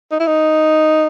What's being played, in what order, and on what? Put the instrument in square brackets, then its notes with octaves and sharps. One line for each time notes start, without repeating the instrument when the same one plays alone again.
[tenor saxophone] D#4
E4
D#4